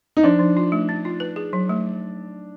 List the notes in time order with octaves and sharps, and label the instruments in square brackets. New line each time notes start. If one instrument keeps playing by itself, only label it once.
[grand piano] D#4
[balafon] F3 [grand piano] D4
[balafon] F3
F4
A3
D4
F4
B4
G#4
F#3
A3